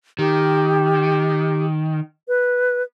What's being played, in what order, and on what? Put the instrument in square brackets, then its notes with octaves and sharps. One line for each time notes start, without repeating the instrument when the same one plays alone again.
[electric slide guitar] D#3 [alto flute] G4
[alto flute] B4